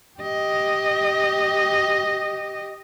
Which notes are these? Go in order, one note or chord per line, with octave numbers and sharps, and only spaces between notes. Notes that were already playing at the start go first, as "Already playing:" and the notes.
G4 D#5